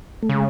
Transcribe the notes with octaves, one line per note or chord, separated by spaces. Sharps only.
A3
C#3 G#3